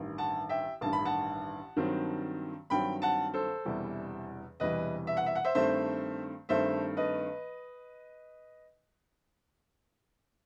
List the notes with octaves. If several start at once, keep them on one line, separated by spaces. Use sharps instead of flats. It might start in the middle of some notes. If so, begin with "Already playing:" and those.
Already playing: A1 G2 D#3
F#5 A5
E5 G5
A1 G2 D#3 A5
B5
F#5 A5
G2 D#3 F#3 C4
G2 D#3 F#3 C4 G5 B5
F#5 A5
A4 C5
E1 E2 C3 E3 G3
E1 E2 C3 E3 G3 B4 D#5
E5
F#5
E5
F#5
C5 E5
G2 D#3 A3 C4 C5 E5
G2 D#3 A3 C4 C5 E5
B4 D#5